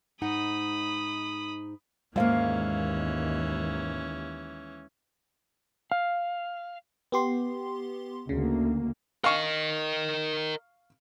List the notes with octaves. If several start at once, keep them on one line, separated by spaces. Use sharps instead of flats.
G#2 D#4 F#5 B5 D#6
D#2 G#2 E3 G#3 A#3 C#4 F5
F5
B3 G4 C6
D2 C#3 A#3
A#4 D#5 F5 C#6